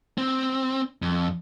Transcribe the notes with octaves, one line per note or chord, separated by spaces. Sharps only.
C4
F2